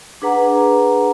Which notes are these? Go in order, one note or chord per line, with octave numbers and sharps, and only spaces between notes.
D4 G#4 B4 F#5 A#5